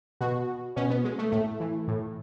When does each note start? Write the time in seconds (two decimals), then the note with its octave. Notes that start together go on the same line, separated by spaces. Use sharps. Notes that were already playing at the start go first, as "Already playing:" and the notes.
0.21 B2 F#4
0.76 B2 C#4
0.90 B3
1.04 G#3
1.18 A3
1.32 A2 A3
1.60 E3
1.88 A2